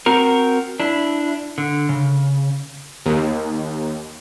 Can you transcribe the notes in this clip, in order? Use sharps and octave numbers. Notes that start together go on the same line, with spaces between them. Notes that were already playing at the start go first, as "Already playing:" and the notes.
C4 F#4 A#4
D4 E4
D3
C#3
D#2